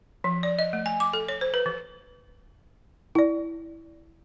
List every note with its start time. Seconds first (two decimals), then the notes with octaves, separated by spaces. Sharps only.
0.24 F3
0.43 D5
0.59 D#5
0.73 A3
0.86 G#5
1.00 D6
1.13 A4
1.29 C#5
1.41 C5
1.54 B4
1.66 E3
3.15 E4 D5